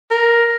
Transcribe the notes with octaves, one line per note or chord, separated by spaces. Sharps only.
A#4